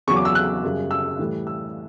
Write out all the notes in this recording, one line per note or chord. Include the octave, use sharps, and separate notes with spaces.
E2 C#3 F#3 C#6
D6
E6
F#6
F#2 C#3 G3
E6
A2 E3 G3
E6